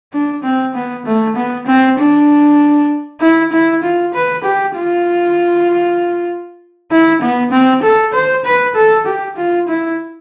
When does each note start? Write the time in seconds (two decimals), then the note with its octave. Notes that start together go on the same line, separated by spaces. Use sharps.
0.13 D4
0.43 C4
0.75 B3
1.06 A3
1.36 B3
1.67 C4
1.98 D4
3.21 E4
3.52 E4
3.83 F4
4.14 B4
4.44 G4
4.76 F4
6.91 E4
7.22 B3
7.51 C4
7.83 A4
8.13 C5
8.45 B4
8.75 A4
9.06 G4
9.37 F4
9.68 E4